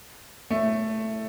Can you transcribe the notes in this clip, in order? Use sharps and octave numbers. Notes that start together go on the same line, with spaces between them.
A3